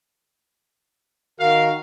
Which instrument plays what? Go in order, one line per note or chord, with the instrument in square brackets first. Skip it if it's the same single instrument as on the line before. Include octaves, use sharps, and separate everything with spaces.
[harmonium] D#3 F#4 A#4 [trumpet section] F5